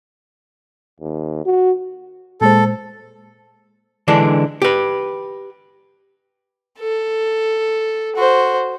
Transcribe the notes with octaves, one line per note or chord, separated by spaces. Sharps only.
D#2
F#4
A#2 G#3 A4 C5
D3 E3 G#3 D4
G4 B4
A4
F#4 C5